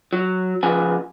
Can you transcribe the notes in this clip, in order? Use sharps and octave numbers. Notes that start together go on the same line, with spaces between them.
F#3
C#3 F3 B4 G#5